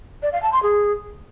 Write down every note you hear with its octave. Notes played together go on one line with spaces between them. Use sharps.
D5
F5
A5
C6
G#4